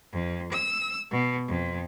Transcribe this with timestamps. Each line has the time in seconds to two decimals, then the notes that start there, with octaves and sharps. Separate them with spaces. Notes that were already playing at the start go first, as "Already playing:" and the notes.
0.12 F2
0.52 E6
1.11 B2
1.47 F2